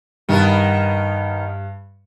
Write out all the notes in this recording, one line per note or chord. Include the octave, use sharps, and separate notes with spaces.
G2 D#3 B3 A#4